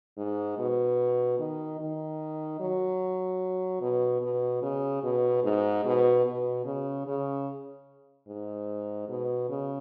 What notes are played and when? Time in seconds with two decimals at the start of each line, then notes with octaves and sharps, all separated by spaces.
0.17 G#2
0.58 B2
1.39 D#3
1.80 D#3
2.60 F#3
3.81 B2
4.22 B2
4.62 C#3
5.03 B2
5.44 G#2
5.85 B2
6.26 B2
6.65 C#3
7.07 C#3
8.28 G#2
9.09 B2
9.49 C#3